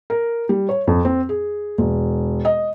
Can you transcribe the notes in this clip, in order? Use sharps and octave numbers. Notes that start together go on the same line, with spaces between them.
A#4
G3
C#5
F2
C4
G#4
E1
D#5